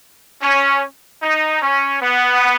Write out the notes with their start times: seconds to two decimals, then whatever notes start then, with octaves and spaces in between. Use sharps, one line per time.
0.43 C#4
1.23 D#4
1.62 C#4
2.02 B3